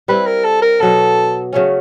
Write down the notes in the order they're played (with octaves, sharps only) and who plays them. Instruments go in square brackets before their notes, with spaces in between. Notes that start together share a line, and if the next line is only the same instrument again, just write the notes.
[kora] G3 C4 E4 [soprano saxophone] B4
[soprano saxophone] A#4
A4
A#4
[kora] B2 F#3 B3 [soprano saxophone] A4
[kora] C#3 F#3 A3 C#4